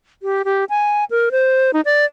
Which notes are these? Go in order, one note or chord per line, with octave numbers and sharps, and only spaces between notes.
G4
G4
G#5
A#4
C5
D#4
D5